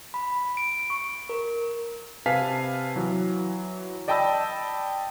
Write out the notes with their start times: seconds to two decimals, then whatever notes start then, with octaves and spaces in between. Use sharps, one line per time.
0.14 B5
0.57 D7
0.90 C#6
1.29 A#4
2.26 C3 B4 F5 G#5 A5 B6
2.96 E3 F#3
4.08 D5 D#5 G5 A5 B5 E6